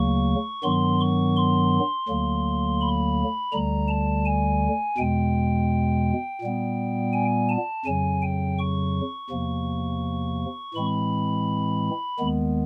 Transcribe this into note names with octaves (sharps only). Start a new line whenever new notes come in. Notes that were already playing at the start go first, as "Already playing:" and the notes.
Already playing: D2 C#3 F#3 A#3 C#6
G2 D#3 F#3 B3 C6
C#6
C6
D2 D3 F#3 A#3
B5
D2 D3 G3 A#5
A5
G#5
E2 B2 G#3 G5
A#2 G3 B3
G#5
A5
F2 C#3 F#3 G#5
G5
C#6
E2 C3 F3 A#3
A2 E3 G#3 C4 B5
D#2 D#3 G#3 B3